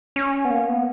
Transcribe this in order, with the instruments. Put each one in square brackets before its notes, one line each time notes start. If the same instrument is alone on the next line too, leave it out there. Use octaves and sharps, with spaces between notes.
[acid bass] C#4
B3
A#3
B3